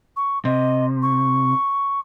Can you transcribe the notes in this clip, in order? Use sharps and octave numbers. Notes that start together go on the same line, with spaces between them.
C#6
C3 D#5
C#6